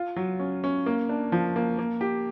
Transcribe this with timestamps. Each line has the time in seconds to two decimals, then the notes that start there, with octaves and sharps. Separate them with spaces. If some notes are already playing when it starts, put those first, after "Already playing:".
Already playing: F4
0.16 F#3
0.39 C#4
0.64 C#4
0.86 A#3
1.09 D4
1.32 F3
1.56 A#3
1.79 A#3
2.01 G4